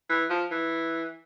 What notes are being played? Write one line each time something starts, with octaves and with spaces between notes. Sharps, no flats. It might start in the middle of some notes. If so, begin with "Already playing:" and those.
E3
F3
E3